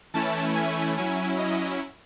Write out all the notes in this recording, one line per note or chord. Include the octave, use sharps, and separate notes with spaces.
E3 A3 C#4 E4 A5
G#5
F#3 C#4 E4 G#5
D#5